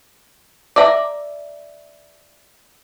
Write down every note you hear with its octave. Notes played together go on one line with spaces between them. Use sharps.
D5 E5 A#5